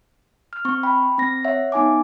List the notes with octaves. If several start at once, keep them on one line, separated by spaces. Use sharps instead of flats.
F6
C4 C#6
G5 B5
C4 A#6
C#5 E5 F#5
B3 D#4 G#5 D6